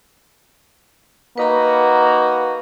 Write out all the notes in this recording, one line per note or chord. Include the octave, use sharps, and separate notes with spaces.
A#3 D#4 F#4 B4 B5